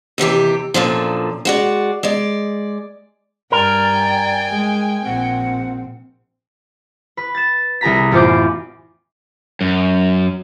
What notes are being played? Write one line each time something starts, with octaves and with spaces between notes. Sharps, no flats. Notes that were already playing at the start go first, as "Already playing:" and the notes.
D#2 C3 E3 G4
F#2 A#2 D3 F3
G#3 F#4 D5
G#3 D5
G2 A#4 D5 G5 G#5
G#3
A#1 C4 F#5
B4
A6 E7
C2 G#4 A#5 B6
A1 F#2 B3 F4 C5 D6
F#2